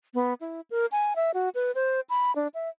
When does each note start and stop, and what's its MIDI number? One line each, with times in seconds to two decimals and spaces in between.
0.14 0.34 59
0.41 0.61 64
0.71 0.86 70
0.92 1.14 80
1.16 1.31 76
1.34 1.49 66
1.55 1.72 71
1.75 2.00 72
2.10 2.34 83
2.36 2.48 62
2.54 2.69 76